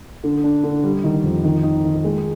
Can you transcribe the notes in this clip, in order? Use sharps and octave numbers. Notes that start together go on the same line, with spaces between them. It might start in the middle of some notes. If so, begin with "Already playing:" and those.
D3
D4
D3
G3
D#3
F2
D#3
D#4
D#3
G#3